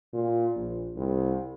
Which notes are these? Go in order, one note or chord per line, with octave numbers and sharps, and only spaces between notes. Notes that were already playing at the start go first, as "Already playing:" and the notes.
A#2
A#1
C2